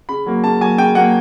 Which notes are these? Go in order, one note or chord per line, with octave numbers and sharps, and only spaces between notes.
C#3 B5
F#3 A#3
C#3 A5
F#3 A#3 G#5
C#3 G5
F#3 A#3 F#5